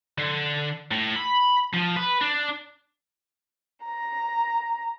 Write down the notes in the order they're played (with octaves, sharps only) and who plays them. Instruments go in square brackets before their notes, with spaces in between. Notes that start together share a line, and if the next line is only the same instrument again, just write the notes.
[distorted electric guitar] D3
A2
B5
F3
B4
D4
[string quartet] A#5